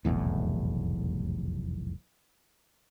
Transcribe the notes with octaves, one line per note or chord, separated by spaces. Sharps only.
F1 B1 E2 A2